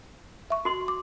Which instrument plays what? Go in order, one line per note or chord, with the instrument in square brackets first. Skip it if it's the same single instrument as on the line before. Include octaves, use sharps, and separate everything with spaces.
[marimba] E5 C#6
[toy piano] F#4 C6
[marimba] D6